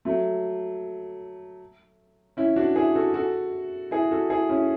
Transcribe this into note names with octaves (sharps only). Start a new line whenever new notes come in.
F#3 A3
C#4 E4
D4 F#4
E4 G#4
F#4 A4
F#4 A4
E4 G#4
F#4 A4
E4 G#4
C#4 E4